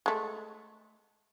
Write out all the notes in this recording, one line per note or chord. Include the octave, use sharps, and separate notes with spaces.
G#3 A3